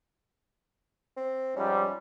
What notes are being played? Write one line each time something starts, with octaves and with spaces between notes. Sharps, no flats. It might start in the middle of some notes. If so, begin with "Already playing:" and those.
C4
G#2 F3 G3 C#4